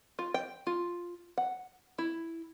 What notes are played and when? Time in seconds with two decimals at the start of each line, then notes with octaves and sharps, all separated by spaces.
0.19 F4
0.34 G5
0.67 F4
1.38 F#5
1.98 E4